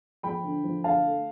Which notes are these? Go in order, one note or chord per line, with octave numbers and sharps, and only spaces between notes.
F3 G5 B5
D3
F3
D3 F5 A5
A3